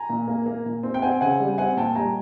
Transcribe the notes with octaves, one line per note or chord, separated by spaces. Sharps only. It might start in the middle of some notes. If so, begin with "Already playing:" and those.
Already playing: G#5 A#5
A#2
A#3
A#3
A#2
C4
G5
C4 F#5 G#5
C#3 F#5 G#5
G3
C4 F#5 G#5
A#2 G5 A5
G3 G#5 A#5